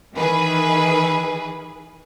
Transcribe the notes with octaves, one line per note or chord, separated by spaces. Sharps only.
D#3 E3 G#4 B4